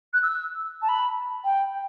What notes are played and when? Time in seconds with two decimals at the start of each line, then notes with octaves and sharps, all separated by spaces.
0.13 F#6
0.22 E6
0.81 A5
0.88 B5
1.44 G5